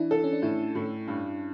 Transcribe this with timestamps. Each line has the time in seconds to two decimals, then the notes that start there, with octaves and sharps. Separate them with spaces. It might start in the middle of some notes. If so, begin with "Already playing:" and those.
Already playing: E3 D4 E4
0.11 A4
0.24 C#4
0.33 D4
0.42 A2 E4
0.75 A2
1.08 G2